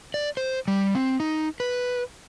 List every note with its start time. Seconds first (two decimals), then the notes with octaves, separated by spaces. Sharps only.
0.14 D5
0.37 C5
0.68 G3
0.95 C4
1.20 D#4
1.60 B4